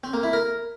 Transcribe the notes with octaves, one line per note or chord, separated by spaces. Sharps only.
C4
A#3
E4
A#4